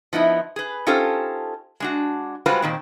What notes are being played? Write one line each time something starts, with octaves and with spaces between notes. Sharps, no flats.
F3 B3 D#4 E4
G#4 B4
C#4 D#4 F4 G4 A4 C5
G#3 D4 F#4
G3 G#3 F4 F#4 B4 C5
A#2 D#3 C4